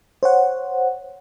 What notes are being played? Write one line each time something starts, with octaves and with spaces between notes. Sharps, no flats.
C5 C#5 F#5